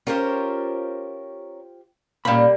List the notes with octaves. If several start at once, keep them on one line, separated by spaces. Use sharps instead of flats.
C#4 F4 G4 A#4 C5 C#5
A#2 G3 A#3 C#4 F5 B5